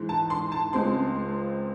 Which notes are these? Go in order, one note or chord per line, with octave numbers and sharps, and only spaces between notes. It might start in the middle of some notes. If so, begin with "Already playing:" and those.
Already playing: G#2 E3 G#3
A5
C6
A5
C#2 C#3 G#3 C4 C6